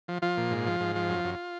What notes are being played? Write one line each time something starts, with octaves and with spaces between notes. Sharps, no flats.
F3
F3 F4
A#2
G#2
F3
G#2
F3
F#2
F#2